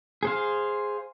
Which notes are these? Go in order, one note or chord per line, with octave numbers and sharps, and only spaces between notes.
G#4 C5 F5